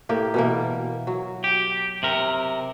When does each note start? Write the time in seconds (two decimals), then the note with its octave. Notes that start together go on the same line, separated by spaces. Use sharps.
0.09 A2 A#3 G4
0.34 B2 E3 A#3
1.07 F#3
1.44 G4
2.03 C3 A#4